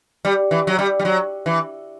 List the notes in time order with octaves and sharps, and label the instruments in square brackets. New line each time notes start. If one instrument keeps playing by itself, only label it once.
[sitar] G3
E3
F#3
G3
G3
F#3
E3